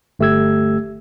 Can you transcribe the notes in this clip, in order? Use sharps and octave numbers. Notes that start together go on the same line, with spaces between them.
G1 A3 G4 E6 G#6